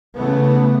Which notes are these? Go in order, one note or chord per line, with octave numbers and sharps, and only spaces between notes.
C#3 E3 A3 B3